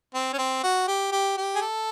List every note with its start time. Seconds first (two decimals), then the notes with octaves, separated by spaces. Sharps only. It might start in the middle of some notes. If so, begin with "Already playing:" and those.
0.15 C4
0.33 C#4
0.38 C4
0.63 F#4
0.88 G4
1.12 G4
1.37 G4
1.56 G#4
1.62 A4